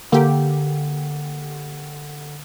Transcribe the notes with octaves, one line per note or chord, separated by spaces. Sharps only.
D3 A#3 G4